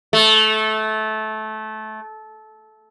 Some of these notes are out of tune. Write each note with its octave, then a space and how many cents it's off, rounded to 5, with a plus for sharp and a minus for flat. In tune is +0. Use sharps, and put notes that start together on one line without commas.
A3 -20